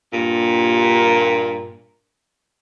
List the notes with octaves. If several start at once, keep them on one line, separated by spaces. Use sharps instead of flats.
G2 A#2